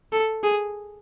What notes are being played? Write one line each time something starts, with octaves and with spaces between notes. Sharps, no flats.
A4
G#4